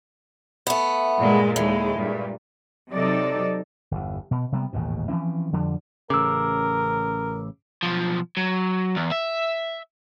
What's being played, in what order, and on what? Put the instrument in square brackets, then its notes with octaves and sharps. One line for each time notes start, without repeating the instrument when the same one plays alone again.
[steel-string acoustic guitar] A3 B3
[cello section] G2 A#2 G#3
[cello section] D#2 G#3 [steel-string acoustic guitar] A2
[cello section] G2 A#2
C3 F#3 D#4 A4 D5
[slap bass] G1 E2
B2
C3 G3 B3
A1 D#2 G#2 B2
E3 F3 C4 C#4
F2 D3 F3 G3
[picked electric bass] A1 C#3 [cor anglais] A#4 [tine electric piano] D6 E6
[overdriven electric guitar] B1 F3
F#3
E2
E5